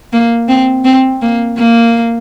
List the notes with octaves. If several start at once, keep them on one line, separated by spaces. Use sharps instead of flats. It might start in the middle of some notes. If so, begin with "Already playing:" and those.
A#3
C4
C4
A#3
A#3